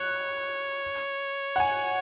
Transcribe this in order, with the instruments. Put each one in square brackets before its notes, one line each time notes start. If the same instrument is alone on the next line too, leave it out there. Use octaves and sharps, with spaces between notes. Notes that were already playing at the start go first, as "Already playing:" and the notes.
Already playing: [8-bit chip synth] C#5 [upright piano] F#6
[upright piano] F#5
G#5